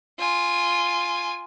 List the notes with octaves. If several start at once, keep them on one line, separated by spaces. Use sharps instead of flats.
F4 G#5